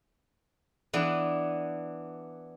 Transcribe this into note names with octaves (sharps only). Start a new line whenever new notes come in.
E3 B3 D4